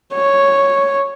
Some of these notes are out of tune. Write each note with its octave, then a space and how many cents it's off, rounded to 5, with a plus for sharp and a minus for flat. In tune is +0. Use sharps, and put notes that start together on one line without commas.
C#5 +0